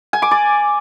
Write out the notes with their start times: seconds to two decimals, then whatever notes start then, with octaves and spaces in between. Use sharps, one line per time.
0.13 G#5
0.22 D6
0.31 D5